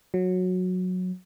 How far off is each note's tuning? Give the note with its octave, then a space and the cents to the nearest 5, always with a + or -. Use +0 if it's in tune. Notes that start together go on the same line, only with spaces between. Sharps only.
F#3 -15